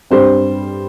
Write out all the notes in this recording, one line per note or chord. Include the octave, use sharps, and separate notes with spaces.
G2 G3 C4 C5